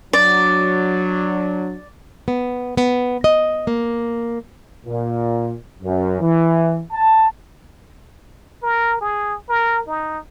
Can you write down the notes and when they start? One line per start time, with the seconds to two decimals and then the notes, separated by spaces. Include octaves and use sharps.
0.13 F#3 D4 D5
2.28 B3
2.77 B3
3.24 D#5
3.67 A#3
4.86 A#2
5.83 F#2
6.21 E3
6.93 A5
8.63 A#4
9.01 G#4
9.49 A#4
9.88 D#4